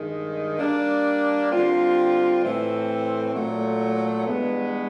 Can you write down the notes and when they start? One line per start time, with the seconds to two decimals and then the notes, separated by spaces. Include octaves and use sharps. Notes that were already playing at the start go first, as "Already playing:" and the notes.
Already playing: G2 D#3 G#3
0.59 G3 A#3 D4
1.51 D3 G3 C4 F4
2.43 A2 E3 A3 C4
3.35 A#2 F#3 A3
4.27 G2 E3 G#3 B3